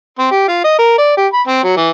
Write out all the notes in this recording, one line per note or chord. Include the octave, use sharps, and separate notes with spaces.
C4
G4
F4
D#5
A#4
D5
G4
B5
C4
F#3
E3